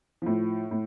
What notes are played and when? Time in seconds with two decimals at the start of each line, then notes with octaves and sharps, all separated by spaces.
0.22 A2 F3
0.71 A2